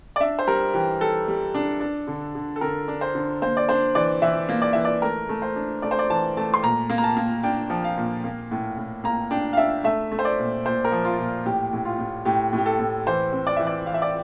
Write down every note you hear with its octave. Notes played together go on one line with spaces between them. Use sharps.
D5
D4 E5
C5
G3 A#4
E3 G4
G3 A4
G3
D4
D4
D3
D3
A4
D3 A#4
D4
C5
D3
A#3 C5
D5
D4 C5
E3 D5
E3 E5
A#3
D5
E3 E5
D5
A3 A#4
A3
C5
D4
A3 D5
C5
D5
E3 A5
A3 A5
C6
A#2 A#5
A#3
A#5
A5
A#3
D4 G5
F3
F5
A#2
A#3
A2
A2
A#3 A#5
D4 G5
F5
D4 E5
A3 E5
A3
C5
D5
A#2
A#2 C5
A#4
F3
F4
A#2
A2 G4
A2
F4
A2
A2 G4
A2
G4
A4
A2
E3 C5
C4
D5
E3 E5
D5
E3 F5
E5
D5